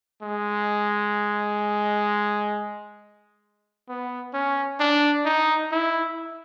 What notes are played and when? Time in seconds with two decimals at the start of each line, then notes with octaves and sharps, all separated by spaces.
0.22 G#3
3.89 B3
4.34 C#4
4.80 D4
5.25 D#4
5.72 E4